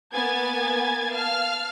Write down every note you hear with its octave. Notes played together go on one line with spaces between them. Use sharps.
A#3 B3 G#5 G#6 A6
F5 A5 F6